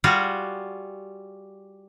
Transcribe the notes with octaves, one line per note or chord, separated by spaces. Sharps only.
G3 F4 F#4 G#4